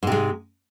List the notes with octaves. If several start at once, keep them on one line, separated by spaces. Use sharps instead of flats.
G#2 C3 G#3